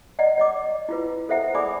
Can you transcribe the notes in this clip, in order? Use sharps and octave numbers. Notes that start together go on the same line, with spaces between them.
D5 D#5 F#5 A#5
C#5 D#5 D6
E4 F4 B4
A4 C5 E5 F#5 A#5
G#4 D5 G#5 B5 D6 D#6